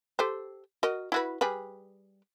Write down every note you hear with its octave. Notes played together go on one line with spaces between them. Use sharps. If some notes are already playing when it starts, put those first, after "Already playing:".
G4 A4 C5
F#4 A#4 D#5
E4 F#4 B4
G3 G#4 B4